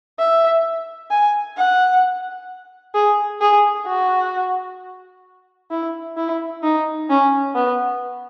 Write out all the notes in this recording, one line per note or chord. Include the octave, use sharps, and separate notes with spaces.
E5
G#5
F#5
G#4
G#4
F#4
E4
E4
D#4
C#4
B3